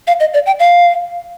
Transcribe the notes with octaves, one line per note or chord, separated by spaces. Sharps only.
F5
D#5
D5
G5
F5